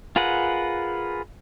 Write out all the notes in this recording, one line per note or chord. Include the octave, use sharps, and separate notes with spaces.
F4 G#4 A#4 B4 F#5